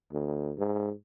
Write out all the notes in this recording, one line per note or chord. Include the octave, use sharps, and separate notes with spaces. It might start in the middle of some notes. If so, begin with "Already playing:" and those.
D2
G#2